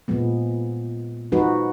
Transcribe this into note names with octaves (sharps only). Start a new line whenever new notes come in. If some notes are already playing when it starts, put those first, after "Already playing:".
A#2 F3 G#3 B3
F3 G#3 D#4 F#4 B4